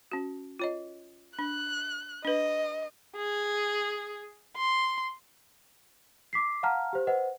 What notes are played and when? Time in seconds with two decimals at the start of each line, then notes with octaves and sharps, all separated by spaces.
0.12 C#4 F#4
0.59 F4 C#5 D#5
1.39 D4 F#6
2.25 D4 B4 D#5
3.17 G#4
4.57 C6
6.33 D6 B6 C7
6.63 F5 F#5 A5 A#5 F6
6.93 G4 C5
7.07 B4 C5 D#5 F#5